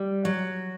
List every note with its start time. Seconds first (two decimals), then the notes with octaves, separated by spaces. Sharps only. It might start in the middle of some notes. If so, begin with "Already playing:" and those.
Already playing: G3
0.25 F#3